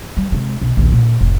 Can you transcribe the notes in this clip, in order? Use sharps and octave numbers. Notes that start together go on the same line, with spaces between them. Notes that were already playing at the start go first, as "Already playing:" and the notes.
G3
C3 G#3
B1
A#1 D#2
A#2 D3
F1 A2